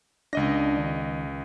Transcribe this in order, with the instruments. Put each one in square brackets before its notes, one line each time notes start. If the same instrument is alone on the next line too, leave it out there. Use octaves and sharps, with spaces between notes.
[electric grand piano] C#2 D#5 A#6 [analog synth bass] D4
[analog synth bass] D#3